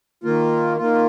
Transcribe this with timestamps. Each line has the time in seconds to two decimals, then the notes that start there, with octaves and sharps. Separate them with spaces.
0.24 D#3 A#3 F4
0.78 D#3 A#3 F4